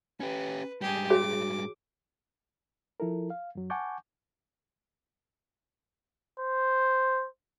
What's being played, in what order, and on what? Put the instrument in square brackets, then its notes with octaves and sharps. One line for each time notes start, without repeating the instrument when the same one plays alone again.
[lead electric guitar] C#4 G4 [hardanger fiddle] B4
[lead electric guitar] G#2 G3 [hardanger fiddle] G4 G#4
[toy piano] F#4 G#4 C#5 [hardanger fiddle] D6
[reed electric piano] F3 E4 A4 A#4
F5
F#2 F#3
F#5 G#5 A5 C#6 D6 G6
[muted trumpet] C5